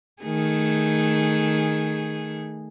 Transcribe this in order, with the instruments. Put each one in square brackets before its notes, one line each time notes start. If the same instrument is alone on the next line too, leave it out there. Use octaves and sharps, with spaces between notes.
[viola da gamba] D#3 A3 G#4